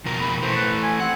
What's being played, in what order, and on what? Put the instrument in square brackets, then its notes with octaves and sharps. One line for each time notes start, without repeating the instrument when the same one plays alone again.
[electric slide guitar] F2 B2 A#4
[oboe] B5
[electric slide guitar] E3 A3 [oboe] C5
[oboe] B4
G#5
[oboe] C4 [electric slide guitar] F#5